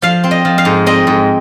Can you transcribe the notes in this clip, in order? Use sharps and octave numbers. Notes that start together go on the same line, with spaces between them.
F3 F5
C4
D#5
F3
F5
G#2
C4 D#5
G#2